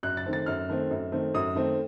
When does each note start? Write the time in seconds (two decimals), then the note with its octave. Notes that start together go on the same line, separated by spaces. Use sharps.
0.03 F#2 F#6
0.17 A6
0.26 D#3 A3 C4
0.33 A6
0.46 F#2 F6
0.69 D#3 A3 C4
0.91 F#2
1.12 D#3 A3 C4
1.34 F#2 D#6
1.55 D#3 A3 C4